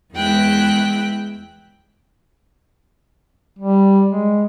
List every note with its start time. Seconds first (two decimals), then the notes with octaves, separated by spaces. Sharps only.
0.13 E2 G#3 E4 G5 F#6
3.59 G3
4.10 G#3